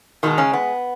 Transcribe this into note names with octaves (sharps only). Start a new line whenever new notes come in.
B2 D#3 G#3 D#4
C#3 C#4
B3